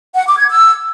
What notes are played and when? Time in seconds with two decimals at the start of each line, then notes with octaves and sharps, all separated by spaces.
0.15 F#5
0.26 D6
0.38 G#6
0.49 E6